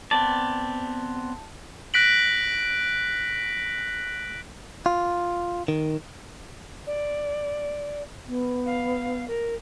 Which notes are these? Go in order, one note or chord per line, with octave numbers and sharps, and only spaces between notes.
B3 C4 D5 A5
F#6 A#6 B6 D7 F#7
F4
D#3
D5
B3
F5
A#4